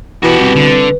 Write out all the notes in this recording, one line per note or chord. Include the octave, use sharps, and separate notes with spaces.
B2 E3 F#4 G4
C2 B4
D3